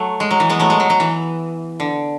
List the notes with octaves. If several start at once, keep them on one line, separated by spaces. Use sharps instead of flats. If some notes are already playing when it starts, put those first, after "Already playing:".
Already playing: F#3 A3
G#3
F#3
E3
G#3 B3
F#3 A3
G#3
F#3
F#3
E3
D3